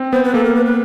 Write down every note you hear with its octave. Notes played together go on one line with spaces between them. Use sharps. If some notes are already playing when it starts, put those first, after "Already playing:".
Already playing: C4
B3 C5
B4
A#3 A4
A#4
B4
B4